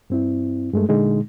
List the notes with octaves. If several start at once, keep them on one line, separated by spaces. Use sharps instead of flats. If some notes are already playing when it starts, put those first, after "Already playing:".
G2 C4 E4
G2 G#3 A3
A#2 D3 G#3 D#4